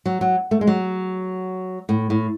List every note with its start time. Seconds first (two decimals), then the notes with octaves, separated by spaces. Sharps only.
0.06 F#3
0.21 F#3
0.51 A3
0.61 G#3
0.67 F#3
1.89 A2
2.10 A2